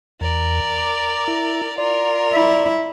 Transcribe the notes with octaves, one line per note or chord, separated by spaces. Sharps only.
E2 A#4 D5
D6
E4
F4 A#4 D5
E4